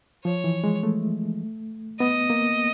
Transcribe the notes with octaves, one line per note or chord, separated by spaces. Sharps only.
F3 C#5
E3
G#3
A3
B3 D#5
A#3